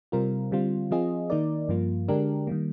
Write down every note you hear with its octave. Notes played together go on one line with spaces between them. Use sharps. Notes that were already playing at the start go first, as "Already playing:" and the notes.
C3 G3 C4 F4 A#4
D3 G3 C4 F4
F3 C4 F4 G#4 D#5
D#3 A#3 D#4 A#4 D5
G2 F3 A#3 F4
D3 G#3 D4 G4 A#4
D#3 G3 A#3